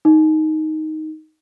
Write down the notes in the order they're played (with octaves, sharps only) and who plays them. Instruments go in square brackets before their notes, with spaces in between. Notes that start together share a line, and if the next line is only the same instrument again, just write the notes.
[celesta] D#4